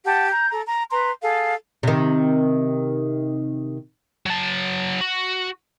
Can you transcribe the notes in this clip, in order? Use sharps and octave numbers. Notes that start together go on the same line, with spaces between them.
G4 F#5 A5
A#5 G6
A4 A#5
A#5
B4 A#5 C6
G#4 A4 F5
C3 D#3
F#3 A5
F#4